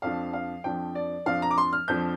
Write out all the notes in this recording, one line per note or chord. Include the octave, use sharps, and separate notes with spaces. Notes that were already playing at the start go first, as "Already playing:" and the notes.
F2 F3 D4 F5
F5
F2 F3 D4 G5
D5
F2 F3 D4 F5
A#5
D6
C6
F6
F2 F3 D4 G6